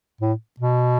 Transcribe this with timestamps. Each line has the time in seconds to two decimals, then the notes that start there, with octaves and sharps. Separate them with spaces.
0.21 A2
0.59 B2